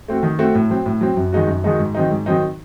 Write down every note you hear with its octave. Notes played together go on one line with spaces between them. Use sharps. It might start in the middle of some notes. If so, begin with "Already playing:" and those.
A3 C4 F#4
D#3
A3 C4 F#4
A2
F#3 C4
A2
F#3 C4
F#2
D#3 G#3 D#4 F#4
F#2
D#3 G#3 D#4 F#4
G#2
D#3 F#3 C4 D#4
G#2
D#3 F#3 C4 D#4